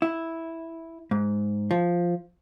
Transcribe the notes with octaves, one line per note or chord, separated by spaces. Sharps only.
E4
G#2
F3